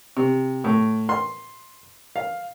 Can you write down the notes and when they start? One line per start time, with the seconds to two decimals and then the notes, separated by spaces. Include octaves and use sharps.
0.17 C3
0.64 A2
1.09 C6
2.16 F5